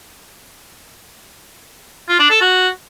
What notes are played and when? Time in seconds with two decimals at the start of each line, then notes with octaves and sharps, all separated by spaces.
2.08 F4
2.19 D4
2.30 A4
2.41 F#4